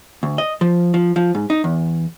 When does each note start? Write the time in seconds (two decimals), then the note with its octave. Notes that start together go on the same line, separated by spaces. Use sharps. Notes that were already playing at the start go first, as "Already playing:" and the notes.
0.23 D2
0.38 D#5
0.61 F3
0.94 F3
1.16 F3
1.35 G#2
1.50 D#4
1.64 E2